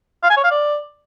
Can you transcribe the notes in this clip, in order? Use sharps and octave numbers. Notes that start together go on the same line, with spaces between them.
F5
G#5
C#5
F5
D5